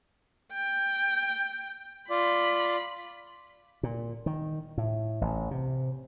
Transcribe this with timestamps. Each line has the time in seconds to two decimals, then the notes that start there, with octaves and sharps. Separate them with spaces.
0.53 G5
2.10 F4 D5 B5
3.83 A#2
4.26 D#3
4.78 A2
5.21 A1
5.51 C3